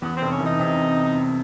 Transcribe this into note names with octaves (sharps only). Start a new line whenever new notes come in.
E2 B3
C4
F1
C#4
E3 D#4
C3